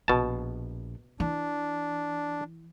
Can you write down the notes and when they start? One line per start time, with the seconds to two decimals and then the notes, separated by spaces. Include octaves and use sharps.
0.08 A#1 B2 A5
1.20 E3 D4